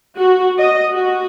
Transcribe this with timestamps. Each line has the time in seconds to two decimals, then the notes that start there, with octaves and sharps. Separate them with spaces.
0.17 F#4
0.59 D#5
0.91 F#4